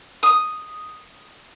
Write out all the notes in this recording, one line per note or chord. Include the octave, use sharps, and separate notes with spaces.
D#6